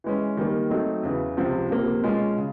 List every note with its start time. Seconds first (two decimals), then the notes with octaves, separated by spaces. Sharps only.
0.04 E3 G#3 C#4
0.37 D#3 G3 A#3
0.70 F#3 A3 C4 D#4
1.03 E2 C#3 E3
1.37 C#2 C3 F3
1.69 C#2 C3 F3 A#3
2.03 B2 G#3 C#4 F4
2.37 C#3